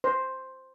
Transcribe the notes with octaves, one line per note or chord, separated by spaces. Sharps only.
C5